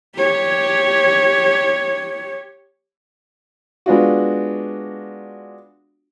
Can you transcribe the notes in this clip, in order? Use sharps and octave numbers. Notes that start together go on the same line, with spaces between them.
G4 C#5
G#3 B3 D4 F4 F#4